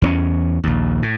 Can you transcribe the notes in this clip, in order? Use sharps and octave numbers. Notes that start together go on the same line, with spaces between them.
E2 A#3 C#4
A#1 D#2
A2